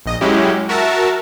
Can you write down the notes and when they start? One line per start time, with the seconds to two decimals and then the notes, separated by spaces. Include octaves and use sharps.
0.06 A#1 D#5
0.21 F#3 G#3 C#4 E4 G4
0.69 F#4 A#4 E5 A5